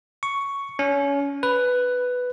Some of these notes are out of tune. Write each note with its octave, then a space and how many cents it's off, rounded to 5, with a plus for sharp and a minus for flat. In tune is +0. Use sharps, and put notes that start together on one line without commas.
C#6 +5
C#4 +25
B4 +5